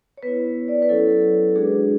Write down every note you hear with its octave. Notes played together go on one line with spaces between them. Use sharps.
C#5
B3 E4 B4
D5
C#5
B4
F#3 C#4 E4 A4
G#3 D4 F#4 G#4